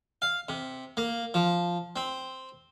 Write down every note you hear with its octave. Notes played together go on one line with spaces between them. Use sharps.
F5
C3
A#3
F3
C4